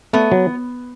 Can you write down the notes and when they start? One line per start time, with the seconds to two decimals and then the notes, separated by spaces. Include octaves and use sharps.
0.13 A3 B3
0.32 F#3